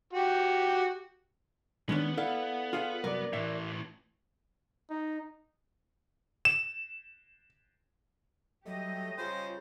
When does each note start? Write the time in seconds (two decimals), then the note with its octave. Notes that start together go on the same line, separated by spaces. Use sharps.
0.13 F#4 G4
1.89 D#3 G#3 B3 C#4 D4
2.17 E4 A4 D5 F5 F#5
2.73 F4 G#4 F5
3.04 C2 F#2 A#4 D5
3.33 A2 E3 E5
4.90 D#4
6.45 E7
8.66 F#3 G3 A3 G4 D#5
9.18 C#3 F4 C5